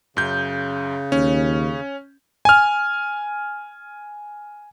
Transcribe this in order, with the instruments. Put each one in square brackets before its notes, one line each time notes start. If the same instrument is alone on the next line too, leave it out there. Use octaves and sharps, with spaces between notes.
[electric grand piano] F#2 G6 [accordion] C#3
[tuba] D#2 [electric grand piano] C#4
[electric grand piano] G#5 F6